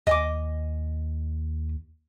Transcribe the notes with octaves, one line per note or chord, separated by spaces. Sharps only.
D#2 D#5 G#5 D6